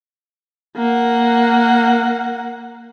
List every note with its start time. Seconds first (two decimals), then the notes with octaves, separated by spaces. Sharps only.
0.77 A#3 F#5